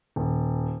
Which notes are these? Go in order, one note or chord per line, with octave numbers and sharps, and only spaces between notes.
D#1